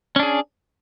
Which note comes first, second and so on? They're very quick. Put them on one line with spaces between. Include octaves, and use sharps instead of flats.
C#4 D4 G#4